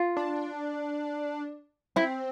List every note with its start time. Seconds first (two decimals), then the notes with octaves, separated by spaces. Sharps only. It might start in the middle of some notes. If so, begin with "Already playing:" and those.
Already playing: F4
0.17 D4
1.96 C4 E4